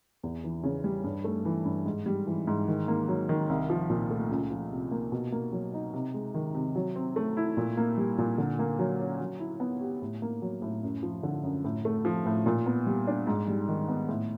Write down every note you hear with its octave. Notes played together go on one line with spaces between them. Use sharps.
E2
E3
C#3
G3
G2
A3
E3
G2
G#2
G3
E3
G#2
D#3
A#3
F#3
D#3
C2
F3
A#2
A3
C#2
F3
C3
A#3
B2
A#3
F#3
D#4
C3
G#3
D#3
C3
F#3
C4
A3
E4
A#2
A#3
G3
A#2
D3
A#3
F#3
C#4
F#3
E4
B3
G4
A2
A#3
F#3
A2
F#2
F3
D3
F#2
A2
A3
F3
A2
A#2
B3
G3
D4
G#2
G3
D#3
B3
A2